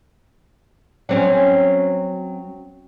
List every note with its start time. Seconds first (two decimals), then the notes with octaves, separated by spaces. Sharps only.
1.09 F#3 C4 C#4